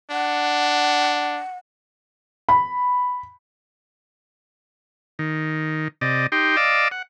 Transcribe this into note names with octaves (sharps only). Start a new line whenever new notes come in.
D4 F#5
B5
D#3
C3 D5 D#5
D#4 G4 G5 C6
D5 D#5 F5 D6 E6
F#5